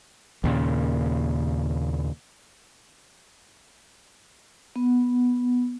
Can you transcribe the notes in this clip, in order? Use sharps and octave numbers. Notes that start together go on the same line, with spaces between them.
D#2 A#2 C#3
B3